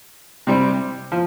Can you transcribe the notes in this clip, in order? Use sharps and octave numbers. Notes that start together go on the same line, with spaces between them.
C3 G3 C4
F3